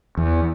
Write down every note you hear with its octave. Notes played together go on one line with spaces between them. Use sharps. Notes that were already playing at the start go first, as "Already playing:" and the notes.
E2